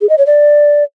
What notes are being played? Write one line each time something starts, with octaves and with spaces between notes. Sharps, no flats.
G#4
D#5
C#5
D5